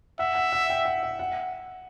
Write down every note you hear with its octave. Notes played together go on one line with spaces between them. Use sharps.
E5 F#5
F#5
F#5
G5
F#5
E5
F#5